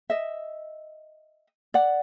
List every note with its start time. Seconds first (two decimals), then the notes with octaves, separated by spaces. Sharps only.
0.10 D#5 E5
1.74 D5 F#5